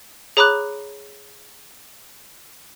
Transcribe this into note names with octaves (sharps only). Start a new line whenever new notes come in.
G#4 C#5 A#5 B5 D6 F#6